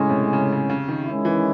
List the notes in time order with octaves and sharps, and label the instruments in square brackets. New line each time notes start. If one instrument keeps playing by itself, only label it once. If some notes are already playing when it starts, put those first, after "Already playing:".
Already playing: [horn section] A2 G#3 C#4 [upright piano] C#3
[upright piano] C3
C#3
C#3
C#3
D#3
[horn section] D#3 G#3 C#4 E4
[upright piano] E3